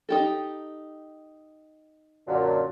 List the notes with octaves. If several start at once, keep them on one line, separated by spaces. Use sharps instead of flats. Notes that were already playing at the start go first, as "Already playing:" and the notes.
D#4 G4 A4
F#2 A#2 D3